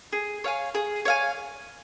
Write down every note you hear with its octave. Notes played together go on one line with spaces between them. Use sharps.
G#4
C#5 F5 G#5
G#4
C#5 F5 G#5